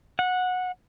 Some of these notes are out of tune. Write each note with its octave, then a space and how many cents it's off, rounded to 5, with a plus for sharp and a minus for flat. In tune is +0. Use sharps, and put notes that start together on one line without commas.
F#5 -15